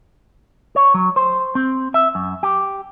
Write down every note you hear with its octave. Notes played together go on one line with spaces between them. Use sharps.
C#5
F#3
C5
C4
E5
F#2
G4